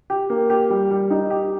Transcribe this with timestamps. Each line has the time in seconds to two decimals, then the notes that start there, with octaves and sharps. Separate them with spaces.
0.10 G4
0.30 A#3
0.50 G4
0.70 G3
0.91 G3
1.10 D#4
1.30 G4